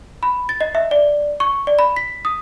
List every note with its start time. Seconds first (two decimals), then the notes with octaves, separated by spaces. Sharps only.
0.23 B5
0.49 A6
0.61 D#5
0.75 E5
0.91 D5
1.40 C#6
1.67 D5
1.79 B5
1.96 B6
2.25 D#6